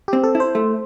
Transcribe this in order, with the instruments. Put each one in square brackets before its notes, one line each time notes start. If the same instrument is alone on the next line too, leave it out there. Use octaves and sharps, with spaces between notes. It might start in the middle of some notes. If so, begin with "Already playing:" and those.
[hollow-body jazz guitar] C4 [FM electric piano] G4
[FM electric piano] A4
[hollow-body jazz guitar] E4
[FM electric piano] C5
[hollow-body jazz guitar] A3